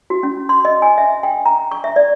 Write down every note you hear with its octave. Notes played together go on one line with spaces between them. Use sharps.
F#4
C#4
C6
D#5
G#5
E5
G5
A#5
C#6
E5
D5